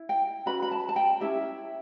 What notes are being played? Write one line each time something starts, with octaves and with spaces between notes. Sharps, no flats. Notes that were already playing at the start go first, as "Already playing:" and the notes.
Already playing: E4
G5
C#4 F#4 B4 B5
B5
A5
A5
G5
C#4 E4 G4 E5